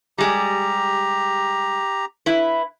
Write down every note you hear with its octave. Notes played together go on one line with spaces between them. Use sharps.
G3 G#3 G4 A#5
E4 B4